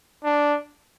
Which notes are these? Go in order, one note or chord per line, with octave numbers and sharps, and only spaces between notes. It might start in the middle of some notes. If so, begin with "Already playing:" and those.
D4